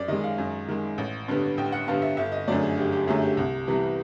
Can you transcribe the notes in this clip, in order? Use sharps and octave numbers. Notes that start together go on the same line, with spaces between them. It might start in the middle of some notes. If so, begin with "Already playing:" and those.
Already playing: F#2 D5
D#3 G#3 D#5
F5
F#2
D#3 G#3
A1
G2 D3 G3 B3
A1 G5
F#5
G2 D3 G3 B3 F5
E5
G1 E5
D#5
F#2 D3 F#3 A3 D5
G#4
G1 G4
G4
F#2 D3 F#3 A3 G#4
G4
C2
C3 E3 G3 B3